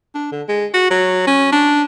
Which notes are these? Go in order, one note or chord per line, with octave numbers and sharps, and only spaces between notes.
D4
D3
G#3
F#4
F#3
C#4
D4